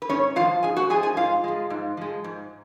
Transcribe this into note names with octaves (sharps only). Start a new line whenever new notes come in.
B4
G#2 C#4 C#5
G#3 F4 F5
F3
G#2 G#4 G#5
F#4 F#5
F3 G#3 G#4 G#5
G#4 G#5
G#2 F4 F5
F3 G#3
G#2
F3 G#3
G#2